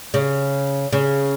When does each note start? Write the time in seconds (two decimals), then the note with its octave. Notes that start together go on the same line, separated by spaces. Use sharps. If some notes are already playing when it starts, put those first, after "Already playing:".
0.14 C#3
0.93 C#3